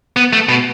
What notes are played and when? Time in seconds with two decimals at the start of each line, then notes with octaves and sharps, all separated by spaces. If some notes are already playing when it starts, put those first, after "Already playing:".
0.17 B3
0.33 A3
0.49 B2